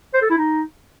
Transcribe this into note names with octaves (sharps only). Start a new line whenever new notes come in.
C5
A4
E4
D#4